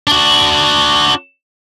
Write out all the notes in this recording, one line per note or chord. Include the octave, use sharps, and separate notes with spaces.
D4 F#4